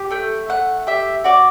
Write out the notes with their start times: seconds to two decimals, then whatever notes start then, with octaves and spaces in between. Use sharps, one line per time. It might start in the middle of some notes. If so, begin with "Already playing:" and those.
Already playing: G4
0.10 A3 G5
0.49 A3 F#5
0.87 G4 E5
1.24 F#4 D5